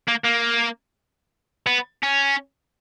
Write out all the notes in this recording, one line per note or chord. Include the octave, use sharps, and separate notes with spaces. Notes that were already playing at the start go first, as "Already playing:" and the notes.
A#3
A#3
B3
C#4